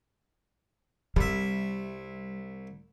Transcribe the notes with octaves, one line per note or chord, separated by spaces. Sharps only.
C2 G3 E5